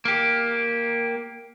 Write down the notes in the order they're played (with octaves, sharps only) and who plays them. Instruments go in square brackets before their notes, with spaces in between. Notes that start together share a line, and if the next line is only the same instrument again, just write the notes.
[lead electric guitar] A#3 G4